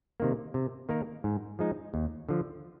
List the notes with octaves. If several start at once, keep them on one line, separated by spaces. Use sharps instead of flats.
C3 D#3 A#3
C3
D#3 A#3 D#4 A#4
G#2
F3 G#3 D#4
D#2
D3 F3